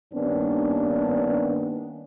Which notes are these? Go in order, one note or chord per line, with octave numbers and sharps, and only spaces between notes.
G2 D#3 A#3 B3 C#4 D4